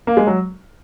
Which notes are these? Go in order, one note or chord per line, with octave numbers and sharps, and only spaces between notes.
A#3
G#3
F#3